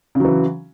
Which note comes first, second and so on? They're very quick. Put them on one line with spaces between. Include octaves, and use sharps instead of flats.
C#3 F#3 E3